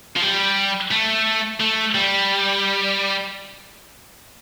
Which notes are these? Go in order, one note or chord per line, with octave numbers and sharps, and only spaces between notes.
F3
G3
A3
A3
G3